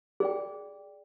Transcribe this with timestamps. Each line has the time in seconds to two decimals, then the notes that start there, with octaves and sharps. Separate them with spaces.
0.20 G#4 D5 G5